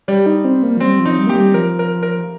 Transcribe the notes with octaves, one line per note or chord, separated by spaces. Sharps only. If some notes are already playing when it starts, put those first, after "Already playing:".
G3 G4
D#4
C4
A#3
F3
G3 C4
F3
D#4
G3
A#3 G4
G3
F3 A#4
A#4
A#4